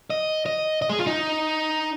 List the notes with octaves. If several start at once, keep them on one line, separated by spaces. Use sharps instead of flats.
D#5
D#5
D#5
G#4
F4
D#4